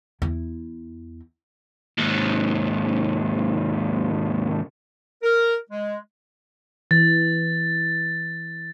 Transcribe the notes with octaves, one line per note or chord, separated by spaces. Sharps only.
E2 E4
D#2 G#2
A#4
G#3
E3 A6